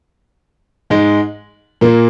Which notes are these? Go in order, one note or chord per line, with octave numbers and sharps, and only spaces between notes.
G#2 G#3
A#2 A#3